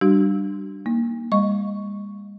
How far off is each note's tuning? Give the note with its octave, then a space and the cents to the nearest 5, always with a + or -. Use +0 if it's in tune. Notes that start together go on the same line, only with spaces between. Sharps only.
G3 +0 D4 +15 F#4 +40
A#3 +5 D#4 +0
G#3 -45 D#5 +0 C#6 +0